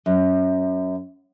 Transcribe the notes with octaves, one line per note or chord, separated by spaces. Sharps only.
F#2